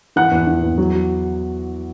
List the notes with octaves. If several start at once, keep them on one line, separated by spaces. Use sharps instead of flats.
E3 F#5 F#6
E2
E3
E2
F#3